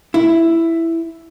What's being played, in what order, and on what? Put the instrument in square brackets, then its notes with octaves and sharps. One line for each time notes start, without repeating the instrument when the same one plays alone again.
[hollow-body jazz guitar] E4